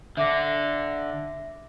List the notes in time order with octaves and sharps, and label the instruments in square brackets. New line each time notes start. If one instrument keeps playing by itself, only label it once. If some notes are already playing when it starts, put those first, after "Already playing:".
[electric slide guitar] D3 [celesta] E5 D6 A#6